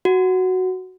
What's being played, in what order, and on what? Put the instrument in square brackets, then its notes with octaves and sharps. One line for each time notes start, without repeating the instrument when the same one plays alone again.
[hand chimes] F#4